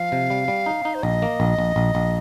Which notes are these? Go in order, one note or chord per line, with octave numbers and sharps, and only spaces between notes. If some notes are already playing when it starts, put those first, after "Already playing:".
Already playing: F3 F5
C3
G3
G3
D#4
D#4
C5
A#1 D#5
A#3
A#1
A#1
A#1
A#1